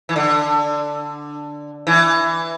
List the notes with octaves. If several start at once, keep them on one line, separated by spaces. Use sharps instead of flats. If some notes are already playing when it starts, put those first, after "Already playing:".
E3
D3
E3